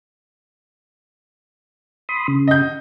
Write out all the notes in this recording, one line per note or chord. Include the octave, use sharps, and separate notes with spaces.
B5 C6 D#6
C#3
D#5 G6